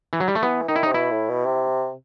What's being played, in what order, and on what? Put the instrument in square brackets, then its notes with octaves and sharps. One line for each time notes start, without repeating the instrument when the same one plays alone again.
[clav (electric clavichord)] E3
F#3
G3
A3
[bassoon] E3 [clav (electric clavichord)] B3
[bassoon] D#3 [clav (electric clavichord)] D#4
[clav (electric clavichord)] E4
D#4
[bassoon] C3
[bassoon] B2 [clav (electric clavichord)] E4
[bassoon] A2
B2
C3